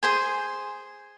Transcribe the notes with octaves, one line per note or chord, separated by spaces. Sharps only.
G#4 C5 G#5